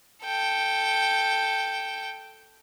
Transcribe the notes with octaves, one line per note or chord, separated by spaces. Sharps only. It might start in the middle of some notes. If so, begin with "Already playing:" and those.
A4 G5